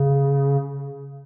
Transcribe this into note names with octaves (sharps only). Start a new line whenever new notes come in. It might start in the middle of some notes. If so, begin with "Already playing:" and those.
Already playing: C#3